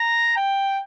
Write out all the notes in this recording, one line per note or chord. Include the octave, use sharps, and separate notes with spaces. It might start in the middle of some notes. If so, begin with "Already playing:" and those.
Already playing: A#5
G5